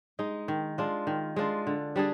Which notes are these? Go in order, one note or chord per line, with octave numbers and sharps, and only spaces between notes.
G#3 D#4
D#3
G#3 D4 F4
D#3
G#3 D4 F4
D3
G3 D4 G#4